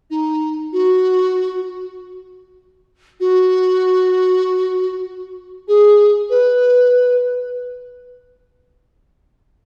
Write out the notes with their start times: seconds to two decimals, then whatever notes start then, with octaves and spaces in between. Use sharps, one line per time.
0.10 D#4
0.72 F#4
3.20 F#4
5.68 G#4
6.30 B4